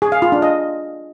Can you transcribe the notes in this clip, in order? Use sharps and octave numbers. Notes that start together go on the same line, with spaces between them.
G#4
F5
F4
D4
D#5